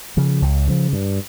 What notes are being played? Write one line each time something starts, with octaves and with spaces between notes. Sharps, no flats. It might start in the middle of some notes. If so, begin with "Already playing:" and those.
C#3 F3
C#2
C#3 F3
G2